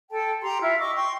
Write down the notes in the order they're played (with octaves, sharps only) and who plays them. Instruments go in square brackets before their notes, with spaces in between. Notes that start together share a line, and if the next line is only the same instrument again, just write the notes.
[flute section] A4 G5 A5
G4 A#5 C6
E4 F4 E5
D#5 C#6 D6 E6
G5 C6 C#6